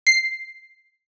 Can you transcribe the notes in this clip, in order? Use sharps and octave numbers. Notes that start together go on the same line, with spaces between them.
C7